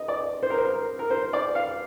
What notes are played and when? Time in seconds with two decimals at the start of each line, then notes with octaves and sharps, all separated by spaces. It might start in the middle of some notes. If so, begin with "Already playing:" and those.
Already playing: D#5
0.08 D5
0.43 C5
0.50 A#4
0.58 C5
0.65 A#4
0.99 A#4
1.10 C5
1.33 D5
1.55 F5